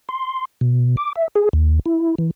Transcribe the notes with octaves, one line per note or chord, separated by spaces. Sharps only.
C6
B2
D6
E5
G#4
D#2
E4
E3